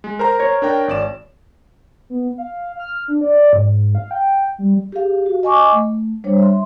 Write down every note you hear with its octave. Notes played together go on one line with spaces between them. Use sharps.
G#3
A#4 C5 A#5
C#5
D4 A#4 G5
G#1 D5 E7
B3
F5
F6
D4
D5
G#2
F5
G5
G3
G4 G#4 F5
F#4
D#5 G#5 C#6 D6
A3
G3 D4 C5 C#5
E5 C6